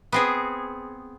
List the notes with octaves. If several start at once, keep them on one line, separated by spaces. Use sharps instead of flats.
B3 C4 G#4